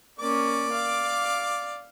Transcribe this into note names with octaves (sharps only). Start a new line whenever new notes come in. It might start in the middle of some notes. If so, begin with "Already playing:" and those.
A#3 C#4 D5 D6
F5